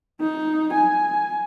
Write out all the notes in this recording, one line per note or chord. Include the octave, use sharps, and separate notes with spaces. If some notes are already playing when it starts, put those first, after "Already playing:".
D#4
G#5